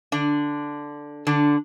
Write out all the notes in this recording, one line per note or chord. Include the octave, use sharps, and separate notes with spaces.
D3 D4
D3 D4